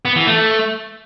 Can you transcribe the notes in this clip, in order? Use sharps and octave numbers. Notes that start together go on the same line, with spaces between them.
B3
E3
A3